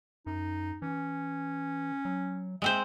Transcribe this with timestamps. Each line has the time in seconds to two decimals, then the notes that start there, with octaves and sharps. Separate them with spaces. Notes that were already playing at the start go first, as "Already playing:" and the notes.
0.27 F#2 D#4
0.82 E3 C#4
2.05 F#3
2.62 G#3 C4 C5 E5